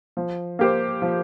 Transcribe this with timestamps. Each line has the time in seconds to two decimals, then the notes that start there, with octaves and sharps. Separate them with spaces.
0.17 F3
0.59 A#3 G4 C5
1.02 F3